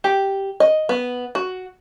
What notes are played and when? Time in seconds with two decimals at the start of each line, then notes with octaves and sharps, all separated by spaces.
0.04 G4
0.60 D#5
0.89 B3
1.35 F#4